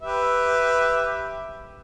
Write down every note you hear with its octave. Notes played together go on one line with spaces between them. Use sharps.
G4 B4 E5